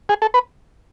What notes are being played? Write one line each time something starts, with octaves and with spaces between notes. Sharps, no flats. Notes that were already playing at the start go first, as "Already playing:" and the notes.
G#4
A4
B4